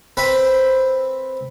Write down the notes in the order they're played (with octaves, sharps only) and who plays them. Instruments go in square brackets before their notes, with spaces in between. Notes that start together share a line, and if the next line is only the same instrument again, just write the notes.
[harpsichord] C4 B4 E5